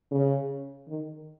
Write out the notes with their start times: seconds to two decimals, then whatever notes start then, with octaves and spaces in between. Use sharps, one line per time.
0.11 C#3
0.88 D#3